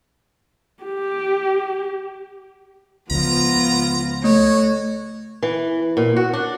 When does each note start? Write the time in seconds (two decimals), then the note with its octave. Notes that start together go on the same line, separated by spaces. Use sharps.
0.84 G4
3.11 C#2 F3 B3 F4 A#5
4.24 A3 F#4 C#5
5.43 E3
5.97 A#2
6.16 F#4
6.33 D4